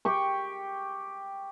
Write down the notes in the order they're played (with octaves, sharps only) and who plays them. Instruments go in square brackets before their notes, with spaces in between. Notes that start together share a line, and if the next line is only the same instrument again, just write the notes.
[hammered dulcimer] G4 G5 C#6